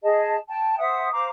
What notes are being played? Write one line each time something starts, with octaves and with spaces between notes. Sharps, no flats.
G#4 D#5 A5
G5 A5
C5 E5 F#5 D#6
C5 F5 A#5 D6